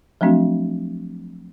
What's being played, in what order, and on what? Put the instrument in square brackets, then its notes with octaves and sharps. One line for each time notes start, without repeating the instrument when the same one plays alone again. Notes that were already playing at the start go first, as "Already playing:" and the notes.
[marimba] F3 F#3 A3 C4 D4 F#4